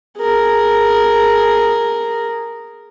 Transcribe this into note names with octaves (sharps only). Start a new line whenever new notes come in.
G#4 A#4